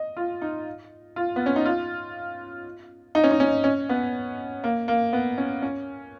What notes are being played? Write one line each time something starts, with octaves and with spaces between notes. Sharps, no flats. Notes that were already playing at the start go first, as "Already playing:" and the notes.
Already playing: D#5
F4
D#4
F4
B3
C#4
D#4
F4
D#4
C#4
D#4
C#4
C#4
B3
A#3
A#3
B3
C#4
C#4